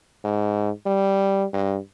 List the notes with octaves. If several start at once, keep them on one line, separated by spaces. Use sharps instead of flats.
G#2
G3
G2